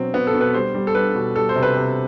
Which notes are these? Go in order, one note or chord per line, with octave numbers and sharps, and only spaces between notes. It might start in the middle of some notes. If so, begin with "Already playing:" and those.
Already playing: B2 F#3 C4
B2 B3
A4
B2
B4
G3 C5
G3
A4
G3 B4
B2
G3 A4
C5
C3
B4
C3